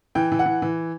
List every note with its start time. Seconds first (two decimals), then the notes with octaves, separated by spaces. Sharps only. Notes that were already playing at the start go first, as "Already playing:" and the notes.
0.15 E3 G5
0.32 E3
0.39 F#5
0.46 E3
0.62 E3